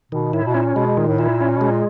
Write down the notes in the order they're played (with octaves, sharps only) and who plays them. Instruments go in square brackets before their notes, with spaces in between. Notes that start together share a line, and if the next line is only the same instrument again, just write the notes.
[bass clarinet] B2 [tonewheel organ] D#3
[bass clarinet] A2 [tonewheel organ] E4
[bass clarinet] B2
[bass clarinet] A#2 [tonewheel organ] C#4
[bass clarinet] B2 [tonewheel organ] G#3
[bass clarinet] A#2 [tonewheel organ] D#3
[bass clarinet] A2
[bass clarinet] A#2 [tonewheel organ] E4
[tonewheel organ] C#4
[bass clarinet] B2 [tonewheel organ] G#3
[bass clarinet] A#2